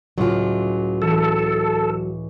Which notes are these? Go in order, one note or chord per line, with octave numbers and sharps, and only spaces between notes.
C#2 A2 F#3 F4 D6
E3 A4